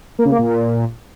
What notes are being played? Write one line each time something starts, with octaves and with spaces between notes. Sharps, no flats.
A#3
C#3
A#3
A#2